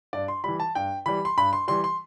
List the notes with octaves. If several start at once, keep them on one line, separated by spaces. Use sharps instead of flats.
G2 D5
C6
E3 G3 B5
A5
G2 G5
E3 G3 B5
C6
G2 B5
C6
E3 G3 C6
C6